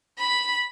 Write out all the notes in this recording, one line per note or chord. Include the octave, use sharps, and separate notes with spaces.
B5